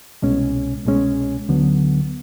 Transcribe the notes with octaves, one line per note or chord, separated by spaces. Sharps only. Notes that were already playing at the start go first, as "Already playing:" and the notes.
C2 B2 G#3 C#4
C2 B2 G#3 C#4
D2 D3 F#3 B3